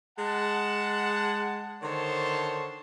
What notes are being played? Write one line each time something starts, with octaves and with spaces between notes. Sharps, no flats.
G#3 F#5 A5
D3 D#3 C5 C#5 A5 C6